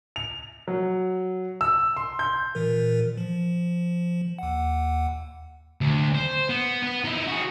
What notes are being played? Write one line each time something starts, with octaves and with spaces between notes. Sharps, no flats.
F7
F#3
E6
C6
G6
A#2 E3 A#4
F3
D#2 F#5
D2
C5
B3
B3
D#4 E4
F#4 G#4